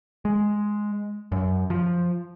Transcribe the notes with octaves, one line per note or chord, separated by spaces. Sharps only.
G#3
F#2
F3